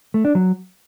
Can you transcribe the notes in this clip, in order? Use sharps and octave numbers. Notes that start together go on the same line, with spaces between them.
A3
D4
F#3